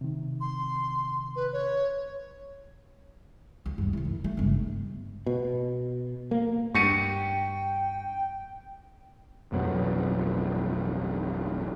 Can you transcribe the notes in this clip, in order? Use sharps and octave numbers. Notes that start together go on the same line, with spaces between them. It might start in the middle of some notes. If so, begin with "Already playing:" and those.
C3 D#3
C6
B4
C#5
D2
E2 G2
C3 E3
D#3
A3
G1 C#2
B2
A#3
G2 G5 C#6 C#7 D#7
A1 F2 B2 F#3